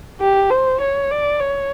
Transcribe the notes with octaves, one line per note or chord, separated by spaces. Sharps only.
G4
C5
C#5
D5
C#5